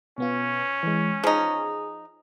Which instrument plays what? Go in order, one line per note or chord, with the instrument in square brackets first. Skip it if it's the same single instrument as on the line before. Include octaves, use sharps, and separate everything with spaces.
[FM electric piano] B2 B3 F4 [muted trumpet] C#4
[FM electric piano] E3 G#3
[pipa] F3 D#4 [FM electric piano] G#4